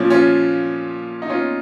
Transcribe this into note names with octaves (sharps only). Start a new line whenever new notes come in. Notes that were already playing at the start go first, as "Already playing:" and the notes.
Already playing: A#2 F3 C#4
C#4 F4
D#4
C#4 F4